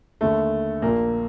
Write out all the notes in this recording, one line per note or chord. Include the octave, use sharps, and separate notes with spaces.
D#2 D3 A3
A#1 A#2 A#3